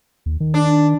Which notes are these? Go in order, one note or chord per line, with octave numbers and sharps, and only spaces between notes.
D#2
D#3
D4